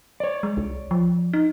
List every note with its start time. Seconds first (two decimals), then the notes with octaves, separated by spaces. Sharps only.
0.20 C#5 D5
0.43 G#3
0.57 C2
0.91 F3
1.33 D#4